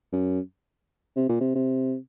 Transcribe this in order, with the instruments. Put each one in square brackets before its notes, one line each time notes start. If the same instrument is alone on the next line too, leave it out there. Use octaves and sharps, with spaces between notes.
[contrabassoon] F#2
C3
A#2
C3
C3